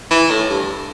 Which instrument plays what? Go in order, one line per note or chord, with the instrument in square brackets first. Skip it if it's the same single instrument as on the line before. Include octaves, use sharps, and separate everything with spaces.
[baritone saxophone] E3
A2
G2